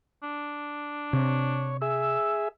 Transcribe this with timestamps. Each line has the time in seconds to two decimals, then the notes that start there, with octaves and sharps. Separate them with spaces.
0.23 D4
1.13 C3 C#5
1.82 G#4 E5 E6